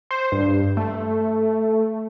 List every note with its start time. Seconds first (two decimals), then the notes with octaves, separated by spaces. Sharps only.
0.11 C5
0.32 G2
0.77 A3